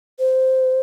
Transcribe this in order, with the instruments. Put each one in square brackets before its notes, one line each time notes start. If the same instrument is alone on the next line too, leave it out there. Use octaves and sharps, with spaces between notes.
[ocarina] C5